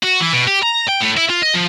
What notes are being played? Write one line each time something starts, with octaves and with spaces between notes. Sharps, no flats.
F#4
E3
B2
G4
A#5
G5
A2
E4
F4
D#5
F3